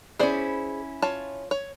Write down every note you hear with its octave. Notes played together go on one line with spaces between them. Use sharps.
C#4 E4 G#4 C5 D5
F4 C#5 A5
C#5